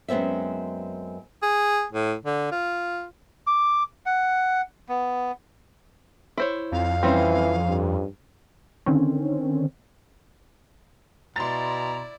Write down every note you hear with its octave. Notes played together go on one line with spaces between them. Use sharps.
F#2 G#3 B3 C4 E5
G#4
A2
D3
F4
D6
F#5
B3
E4 C5 C#5
F2 F5
E3 G3 C4 C#4
G2
D3 D#3 C4 C#4
B2 E4 D5 A#5 C6 A6